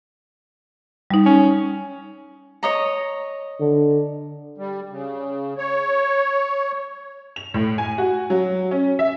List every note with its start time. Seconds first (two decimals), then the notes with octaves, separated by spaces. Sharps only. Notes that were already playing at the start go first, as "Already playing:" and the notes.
1.11 G3 D#4
1.26 C#4
2.63 C#5 D#5 A#5
3.60 D3
4.58 G3
4.91 C#3
5.58 C#5
7.36 F7
7.54 A2
7.78 G#5
7.98 F#4
8.30 F#3
8.71 C#4
8.99 E5